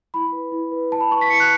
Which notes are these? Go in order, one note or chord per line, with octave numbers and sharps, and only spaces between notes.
E4 B5
B4
E4
B4
E4 A5
B5
B4 C#6
B6
E4 C#7
F#6